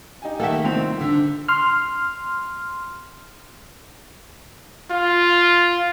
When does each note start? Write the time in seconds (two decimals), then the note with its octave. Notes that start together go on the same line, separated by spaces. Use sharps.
0.22 D#4 G4 G#5
0.40 D#3 A3 A#3 G4 A4 E5 F#5 G5
0.65 C2 F3 C4 F7
1.01 D3 E6 B6
1.48 C6 F6
4.91 F4